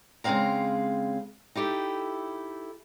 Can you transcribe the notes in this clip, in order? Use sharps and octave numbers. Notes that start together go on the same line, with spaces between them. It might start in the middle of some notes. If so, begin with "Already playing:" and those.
C#3 G#3 A#3 C4 F5 A#5
D#4 E4 G4 A4